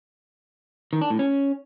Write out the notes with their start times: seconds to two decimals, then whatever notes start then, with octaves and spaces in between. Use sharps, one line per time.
0.93 D#3
1.02 D4
1.10 A2
1.19 C#4